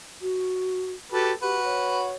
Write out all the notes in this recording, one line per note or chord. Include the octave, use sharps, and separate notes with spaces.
F#4
F#4 G4 A4 B4
F#4 G4 B4
C#5